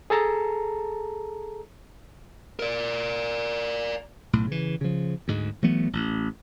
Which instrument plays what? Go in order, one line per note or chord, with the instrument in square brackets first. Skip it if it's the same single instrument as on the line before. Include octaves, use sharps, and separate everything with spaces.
[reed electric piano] G#4 A4 A5 A#5
[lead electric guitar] A#4 D5
[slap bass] B1 A2
C#3 E3
C#3 F3
D2 G#2 G#3
E3 F#3 A3 B3
A1